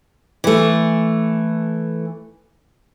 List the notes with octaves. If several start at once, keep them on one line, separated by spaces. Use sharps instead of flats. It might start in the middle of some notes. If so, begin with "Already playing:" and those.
E3 A3